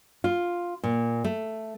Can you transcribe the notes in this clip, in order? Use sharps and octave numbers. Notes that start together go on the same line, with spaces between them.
F4
A#2
A3